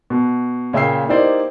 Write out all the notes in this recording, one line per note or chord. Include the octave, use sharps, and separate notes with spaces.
B2
A#2 C#3 E5 G5 E6 C7
A#3 D#4 E4 G4 C5 D5